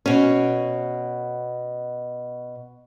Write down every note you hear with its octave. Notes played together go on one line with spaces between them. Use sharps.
B2 C#4